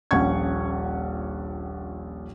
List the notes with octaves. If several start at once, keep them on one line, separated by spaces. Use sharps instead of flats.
D#1 A#1 C#4 F#5 C#6 G#6